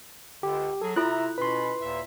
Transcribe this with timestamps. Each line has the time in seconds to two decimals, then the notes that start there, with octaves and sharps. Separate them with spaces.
0.43 C#2 D3 G4
0.81 F#3 G#4 A4
0.96 C3 E4 F4 A4 E5 A#5 F#6
1.38 B2 C#4 B4 B5 C6
1.81 D#2 A#2 E5